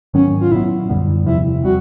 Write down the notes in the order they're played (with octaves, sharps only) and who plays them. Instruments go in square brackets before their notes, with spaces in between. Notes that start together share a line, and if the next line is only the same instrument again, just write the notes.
[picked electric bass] G#2 D#3 F#3 B3 [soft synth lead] C#4
[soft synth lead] F4
[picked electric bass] A#2 F#3 B3 [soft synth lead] E4
[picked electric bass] F#2 D3 G3 B3
[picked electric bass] E2 C3 F3 [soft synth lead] E4
[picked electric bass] G3 C4 [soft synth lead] F#4